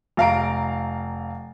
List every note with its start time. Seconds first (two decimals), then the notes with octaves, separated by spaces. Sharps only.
0.17 F1 F5 A#5 D7